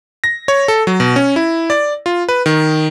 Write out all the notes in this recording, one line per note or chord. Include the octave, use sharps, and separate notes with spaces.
A#6
C#5
A4
F#3
B2
C#4
E4
D5
F4
B4
D#3